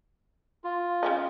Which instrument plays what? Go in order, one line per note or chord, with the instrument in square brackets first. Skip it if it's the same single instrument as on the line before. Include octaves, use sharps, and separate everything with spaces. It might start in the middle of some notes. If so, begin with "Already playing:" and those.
[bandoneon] F4
[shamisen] C#3 G3 D#5